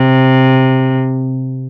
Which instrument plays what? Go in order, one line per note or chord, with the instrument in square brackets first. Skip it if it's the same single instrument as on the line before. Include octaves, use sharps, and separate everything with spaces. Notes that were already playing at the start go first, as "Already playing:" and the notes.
Already playing: [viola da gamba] C3